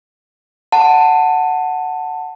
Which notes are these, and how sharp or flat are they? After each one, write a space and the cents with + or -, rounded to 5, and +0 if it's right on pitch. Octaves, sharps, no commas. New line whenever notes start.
F#5 +0 A5 +10